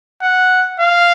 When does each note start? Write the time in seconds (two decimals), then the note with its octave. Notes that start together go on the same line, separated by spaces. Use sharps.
0.22 F#5
0.80 F5